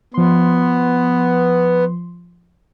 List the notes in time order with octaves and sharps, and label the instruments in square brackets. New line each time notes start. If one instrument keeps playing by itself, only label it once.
[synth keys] F3 C6 [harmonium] B3